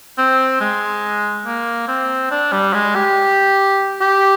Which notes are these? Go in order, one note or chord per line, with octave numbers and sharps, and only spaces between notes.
C4
G#3
A#3
C4
D4
G3
G#3
G4
G4